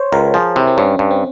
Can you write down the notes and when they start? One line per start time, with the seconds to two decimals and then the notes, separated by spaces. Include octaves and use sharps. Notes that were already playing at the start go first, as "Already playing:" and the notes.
Already playing: C5 C#5
0.12 C#2 A#4
0.34 F3 G#4
0.56 C3 E4
0.67 C4
0.77 G2 C#4
0.99 G2
1.11 C4